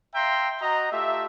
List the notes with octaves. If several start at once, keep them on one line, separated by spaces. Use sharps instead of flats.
E5 F5 G5 A#5 C6
F#4 D#5 A#5
A3 F4 G4 E5